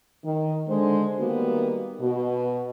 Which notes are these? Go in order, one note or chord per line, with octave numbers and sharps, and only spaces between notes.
D#3
D3 G#3 C5
D#3 G3 A#3 B3 F#4
B2